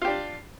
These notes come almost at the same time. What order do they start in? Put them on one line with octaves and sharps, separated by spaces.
F4 G4 D4